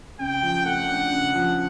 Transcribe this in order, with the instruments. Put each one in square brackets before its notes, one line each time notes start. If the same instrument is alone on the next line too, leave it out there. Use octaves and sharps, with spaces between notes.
[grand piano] C#3 [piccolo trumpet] G5
[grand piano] F3
[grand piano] A3 [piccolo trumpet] F#5
[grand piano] D4
C#3
F3